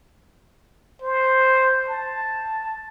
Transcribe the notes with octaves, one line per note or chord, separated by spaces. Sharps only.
C5
A5